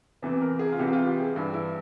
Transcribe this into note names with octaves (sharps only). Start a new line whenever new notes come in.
E2 C3 E3
A#4
G#4
F4
C2 C3 E3 G4
F4
G4
G#4
G2 E3
E4